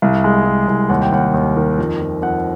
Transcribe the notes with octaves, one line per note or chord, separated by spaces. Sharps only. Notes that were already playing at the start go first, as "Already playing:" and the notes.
C2 F5
G#3
C2
C2
D#2 F#5
G5
D#2 F#5
D#2
D#3
F2
F2
F2 F#5